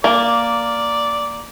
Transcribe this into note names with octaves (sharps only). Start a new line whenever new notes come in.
A#3 D5